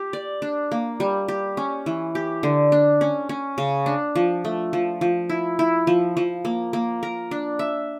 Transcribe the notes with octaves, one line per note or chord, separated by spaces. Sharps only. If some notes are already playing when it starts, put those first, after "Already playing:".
Already playing: G4
D5
D4
A#3
G3
G4
C#4
E3
G4
D3
D4
C#4
C#4
C#3
D4
F3
A3
F3
F3
E4
E4
F3
F3
A#3
A#3
A#4
D4
E5